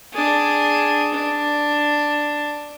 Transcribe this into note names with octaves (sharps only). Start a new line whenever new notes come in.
D4 G#4
D4